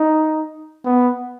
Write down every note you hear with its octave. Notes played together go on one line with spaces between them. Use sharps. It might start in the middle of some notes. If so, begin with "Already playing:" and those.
Already playing: D#4
B3